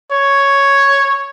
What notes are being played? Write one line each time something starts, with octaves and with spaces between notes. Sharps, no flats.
C#5